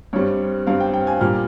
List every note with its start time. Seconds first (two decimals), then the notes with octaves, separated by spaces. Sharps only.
0.13 G2 G3 C4 C#5
0.67 G2 G3 C4 F5
0.80 G5
0.93 G5
1.07 G#5
1.21 A#2 G3 A#3 F6